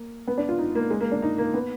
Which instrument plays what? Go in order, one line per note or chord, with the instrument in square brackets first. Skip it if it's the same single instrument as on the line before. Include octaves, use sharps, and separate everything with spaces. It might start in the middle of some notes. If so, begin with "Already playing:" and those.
Already playing: [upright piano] A#3
B3
D4
F4
D#4
A#3
G#3
A#3
D4
D#4
A#3
B3